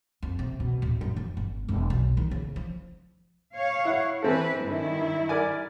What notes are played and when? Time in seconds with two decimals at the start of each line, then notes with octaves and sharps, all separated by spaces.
0.23 F2
0.39 C3
0.60 B2
0.82 D1
1.01 F#2
1.16 F2
1.37 G1
1.69 E1
1.90 B1
2.17 D#3
2.31 C#3
2.56 F3
3.55 C#5 F5
3.85 E4 F#5
4.22 E3 C4 E4 A4 B4
4.63 G2 D#3 E4
5.29 A#4 D5 G#5